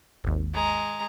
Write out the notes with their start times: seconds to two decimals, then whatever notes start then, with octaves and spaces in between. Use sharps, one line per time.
0.24 G#1 D#2
0.54 G#3 A#5